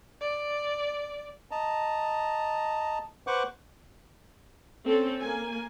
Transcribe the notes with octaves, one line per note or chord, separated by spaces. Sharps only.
D5
D#5 A5 A#5
B4 C5 F#5 C#6 D6 F#6
C4 C#4 A4
A#3 G#5